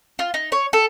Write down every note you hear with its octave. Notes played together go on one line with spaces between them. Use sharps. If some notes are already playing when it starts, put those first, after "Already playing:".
F4
D#4
C#5
A4